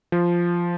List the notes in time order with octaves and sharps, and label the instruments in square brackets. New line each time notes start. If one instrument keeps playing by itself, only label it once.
[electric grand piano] F3